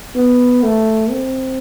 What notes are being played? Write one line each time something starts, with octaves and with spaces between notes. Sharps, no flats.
B3
A3
C4